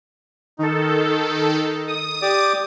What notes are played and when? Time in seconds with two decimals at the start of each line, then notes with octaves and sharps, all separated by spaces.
0.59 D#3 D#4 A4
1.88 D#6
2.22 G4 D5 D6